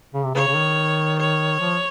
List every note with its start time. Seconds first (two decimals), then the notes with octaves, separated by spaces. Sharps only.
0.14 C#3
0.25 C3
0.35 C#3 C#5
0.48 C#3
0.56 D#3
1.18 C#5
1.60 F3